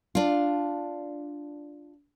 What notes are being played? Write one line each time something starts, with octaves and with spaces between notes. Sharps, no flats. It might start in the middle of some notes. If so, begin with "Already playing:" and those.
D4 F4